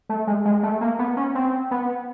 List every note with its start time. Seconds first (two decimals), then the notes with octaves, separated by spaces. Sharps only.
0.09 A3
0.27 G#3
0.45 G#3
0.63 A3
0.81 A#3
0.99 B3
1.17 C#4
1.35 C4
1.71 B3